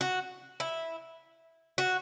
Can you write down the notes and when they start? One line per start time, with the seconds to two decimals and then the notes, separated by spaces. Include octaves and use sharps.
0.01 F#4
0.60 E4
1.78 F#4